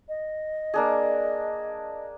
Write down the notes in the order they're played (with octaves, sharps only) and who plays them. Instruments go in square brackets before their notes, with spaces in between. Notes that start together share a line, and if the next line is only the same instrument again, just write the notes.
[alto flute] D#5
[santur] A#3 D4 G#4